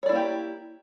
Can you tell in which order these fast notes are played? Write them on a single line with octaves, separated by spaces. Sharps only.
C#5 D5 E4 A#3 G4